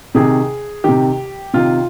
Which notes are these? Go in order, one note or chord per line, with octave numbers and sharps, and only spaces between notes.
C3 D#3 G#4
C3 D#3 G4
C3 D#3 F4